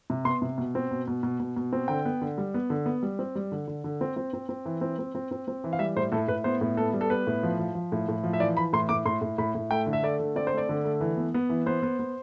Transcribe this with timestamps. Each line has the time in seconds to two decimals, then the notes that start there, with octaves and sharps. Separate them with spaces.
0.10 C3
0.25 B3 C6
0.42 C3
0.58 B2
0.75 C4
0.91 B2
1.08 B2
1.23 B2
1.40 B2
1.57 B2
1.73 C4
1.88 D3 G5
2.05 B3
2.22 D3
2.38 G3
2.54 B3
2.70 D3
2.86 B3
3.03 G3
3.19 C4
3.35 G3
3.52 D3
3.68 D3
3.84 D3
4.01 C4
4.17 C4
4.33 C4
4.49 C4
4.65 E3
4.81 C4
4.99 C4
5.15 C4
5.31 C4
5.48 C4
5.64 E3
5.73 F5
5.79 G3 E5
5.96 A2 C5
6.12 A2 A4
6.28 A2 B4
6.44 B3 C5
6.61 A2
6.77 B3 A4
6.93 G3
7.01 A4
7.10 B3 B4
7.27 A2
7.43 F3
7.60 F3
7.75 F3
7.92 A2
8.08 A2
8.24 F3
8.33 E5
8.40 E3 D5
8.56 E3 B5
8.73 A2 C6
8.89 A2 D6
9.05 A2 C6
9.22 A2
9.38 A2 B5
9.55 A2
9.71 A3 G5
9.87 D3
9.93 E5
10.03 A3 D5
10.20 D3
10.36 C4 D5
10.47 C5
10.53 A3
10.58 D5
10.69 D3
10.85 A3
11.01 E3
11.17 B3
11.34 B3
11.50 E3
11.66 B3 C5
11.83 B3
11.99 B3